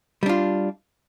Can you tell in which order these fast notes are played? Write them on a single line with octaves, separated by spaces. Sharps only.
G3 D4 F4